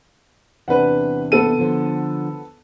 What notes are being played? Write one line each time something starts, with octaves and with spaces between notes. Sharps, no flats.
E2 C3 D4 B4 F#5
B3 A4 D#7
D3 F3